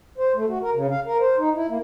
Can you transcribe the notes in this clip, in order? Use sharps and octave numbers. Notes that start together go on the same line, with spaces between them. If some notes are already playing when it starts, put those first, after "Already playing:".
C5
A3
F#4
A#4
C#3
F5
A#4
C5
D#4
E4
A#3